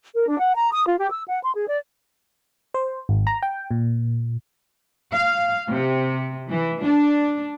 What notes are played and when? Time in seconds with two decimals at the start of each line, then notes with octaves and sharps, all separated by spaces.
0.15 A#4
0.27 D4
0.39 F#5
0.55 A#5
0.71 D#6
0.86 F4
0.98 G4
1.11 E6
1.27 F#5
1.43 C6
1.55 G#4
1.68 D5
2.74 C5
3.09 G#1
3.27 A#5
3.43 G5
3.71 A#2
5.14 F5
5.71 C3
6.49 E3
6.83 D4